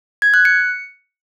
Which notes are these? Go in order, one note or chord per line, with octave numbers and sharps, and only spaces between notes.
G#6
F#6
C#7